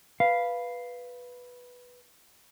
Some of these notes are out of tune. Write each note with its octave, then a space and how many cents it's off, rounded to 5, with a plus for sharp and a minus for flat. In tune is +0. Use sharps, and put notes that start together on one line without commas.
B4 -5 F5 -5